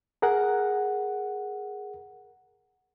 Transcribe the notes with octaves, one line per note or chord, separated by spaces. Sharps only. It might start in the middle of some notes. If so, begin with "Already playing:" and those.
G#4 A#4 F#5